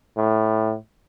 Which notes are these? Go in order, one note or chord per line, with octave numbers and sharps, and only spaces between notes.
A2